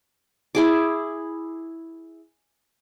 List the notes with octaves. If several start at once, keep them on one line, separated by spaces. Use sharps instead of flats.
E4 G#4 D6